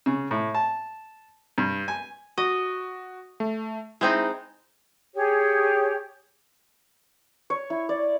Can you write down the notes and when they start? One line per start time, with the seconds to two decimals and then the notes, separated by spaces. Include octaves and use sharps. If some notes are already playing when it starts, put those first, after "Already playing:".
0.06 C#3
0.31 A2
0.55 A5
1.58 G2
1.88 G#5
2.38 F#4 D#5
3.40 A3
4.01 G#3 C4 D#4 E4
5.14 G4 G#4 C#5
7.50 C#5
7.70 E4
7.89 D5